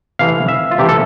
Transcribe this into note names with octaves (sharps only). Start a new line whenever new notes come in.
C3 E3 A3 F5
E5
F4
C3 E3 A3 G4
A4